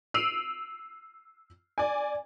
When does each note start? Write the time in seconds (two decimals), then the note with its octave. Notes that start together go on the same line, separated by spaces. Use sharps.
0.14 E6 C7 D7 D#7 F7 F#7
1.78 D5 G#5